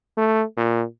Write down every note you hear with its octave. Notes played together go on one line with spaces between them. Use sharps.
A3
A#2